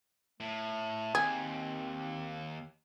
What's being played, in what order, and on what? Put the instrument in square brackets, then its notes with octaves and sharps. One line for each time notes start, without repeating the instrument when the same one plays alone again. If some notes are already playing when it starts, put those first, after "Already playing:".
[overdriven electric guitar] A2 [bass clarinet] A3
[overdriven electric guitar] D#2 [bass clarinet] C4 [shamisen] G#4